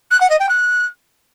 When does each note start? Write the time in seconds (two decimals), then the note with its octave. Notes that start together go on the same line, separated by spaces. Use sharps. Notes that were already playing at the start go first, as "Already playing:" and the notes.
0.11 F#6
0.21 F#5
0.30 D#5
0.40 G5
0.49 F#6